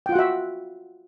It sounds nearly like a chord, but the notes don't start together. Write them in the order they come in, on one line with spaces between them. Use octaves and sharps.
G5 F4 F#5 F#4 E5